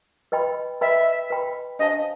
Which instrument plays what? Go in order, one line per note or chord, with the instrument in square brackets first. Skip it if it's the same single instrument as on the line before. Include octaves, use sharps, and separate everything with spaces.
[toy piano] B4 D#5 G5 B5
[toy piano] B4 D#5 G5 B5 [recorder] E5
[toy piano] B4 D#5 G5 B5
[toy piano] D4 G4 C5 F5 A5 [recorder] D#5